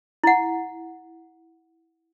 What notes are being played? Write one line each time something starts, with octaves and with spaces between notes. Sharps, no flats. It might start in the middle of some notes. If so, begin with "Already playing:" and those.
E4 F#5